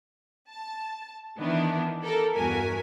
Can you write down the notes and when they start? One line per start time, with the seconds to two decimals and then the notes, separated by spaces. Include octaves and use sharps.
0.49 A5
1.37 D#3 E3 B3 D4 E4
2.03 G4 A4 A#4
2.36 E2 G2 F#4 A#4 G#5 B6